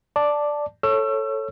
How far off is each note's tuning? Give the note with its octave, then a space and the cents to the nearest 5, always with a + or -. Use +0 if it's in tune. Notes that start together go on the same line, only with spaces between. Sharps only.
D5 +0 A5 +0
A4 +0 C#5 -10 E6 +30